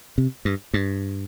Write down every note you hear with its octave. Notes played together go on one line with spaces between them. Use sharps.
C3
G2
G2